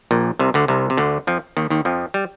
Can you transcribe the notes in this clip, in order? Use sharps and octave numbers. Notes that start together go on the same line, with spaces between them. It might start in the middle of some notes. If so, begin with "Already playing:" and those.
A#1 A#2
C2 C3
D2 D3
C2 C3
C3
D2 D3
F2 F3
D#2 D#3
D#2 D#3
F2 F3
G3